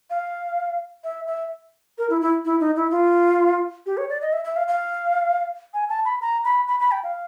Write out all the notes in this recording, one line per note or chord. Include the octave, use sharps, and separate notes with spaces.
F5
E5
E5
A#4
E4
E4
E4
D#4
E4
F4
G4
C#5
D5
D#5
E5
E5
F5
F5
G#5
A5
B5
A#5
B5
B5
B5
G5
F5